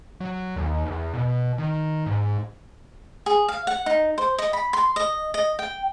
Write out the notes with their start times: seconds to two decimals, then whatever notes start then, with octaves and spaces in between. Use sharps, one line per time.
0.20 F#3
0.56 D#2
0.86 E2
1.13 B2
1.58 D#3
2.06 G#2
3.26 G#4
3.48 F5
3.67 F#5
3.86 D#4
4.18 C5
4.38 D#5
4.53 B5
4.73 C6
4.96 D#5
5.34 D#5
5.59 G5